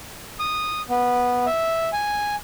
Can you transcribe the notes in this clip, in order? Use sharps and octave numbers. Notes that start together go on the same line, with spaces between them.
D#6
B3
E5
G#5